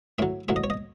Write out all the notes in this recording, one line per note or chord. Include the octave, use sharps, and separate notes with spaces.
A2 F#3 E5
A2 F#3 E5
D#5
C#5
D#5